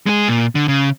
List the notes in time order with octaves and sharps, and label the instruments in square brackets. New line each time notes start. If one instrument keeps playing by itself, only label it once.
[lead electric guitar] G#3 G#4
A#2
D3
C#3